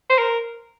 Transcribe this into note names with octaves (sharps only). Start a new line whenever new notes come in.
C5
A#4